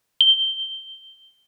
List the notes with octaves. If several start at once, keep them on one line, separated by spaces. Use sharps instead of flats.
G7